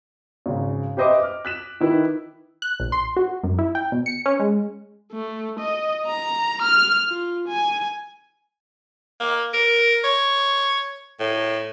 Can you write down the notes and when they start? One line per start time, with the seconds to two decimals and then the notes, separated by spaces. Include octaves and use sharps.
0.46 G#1 C#3
0.97 G4 B4 C5 D#5 E5 D6
1.20 D6 F6
1.45 F#6 B6 E7
1.81 D#3 E4 B4
2.62 F#6
2.80 A#1
2.92 C6
3.16 F#4
3.44 F#2
3.58 E4
3.75 G5
3.92 B2
4.06 C#7
4.26 C#4
4.39 G#3
5.12 A3
5.59 D#5
6.06 A#5
6.62 F6
7.09 F4
7.48 G#5
9.20 A#3
9.54 A#4
10.04 C#5
11.20 A2